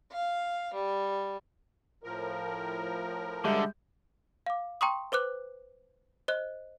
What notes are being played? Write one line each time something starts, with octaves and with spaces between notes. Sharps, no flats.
F5
G3
A2 F3 A#4
D3 G3 G#3 E5 G6
F5 D6
G5 A#5 C6 C#6 D#6
B4 C5 D6 F#6
C5 D#5 F#6